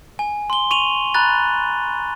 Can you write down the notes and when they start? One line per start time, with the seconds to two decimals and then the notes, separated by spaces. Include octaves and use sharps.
0.19 G#5
0.50 C6 G7
0.71 C#6 D#7 F7 F#7
1.14 A#5 B5 F#6 A6